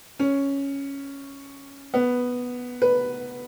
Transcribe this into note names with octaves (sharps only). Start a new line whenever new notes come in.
C#4
B3
B4